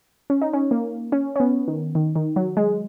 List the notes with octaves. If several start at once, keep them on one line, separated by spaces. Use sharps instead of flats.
C#4
D#4
C#4
A#3
C#4
C#4
B3
D#3
D#3
D#3
F#3
G#3